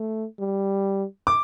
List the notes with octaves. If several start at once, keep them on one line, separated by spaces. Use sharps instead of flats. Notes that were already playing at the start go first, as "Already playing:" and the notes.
Already playing: A3
G3
D6